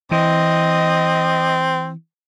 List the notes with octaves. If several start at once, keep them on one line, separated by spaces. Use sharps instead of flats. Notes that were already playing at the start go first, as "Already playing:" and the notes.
E3 C4 D#5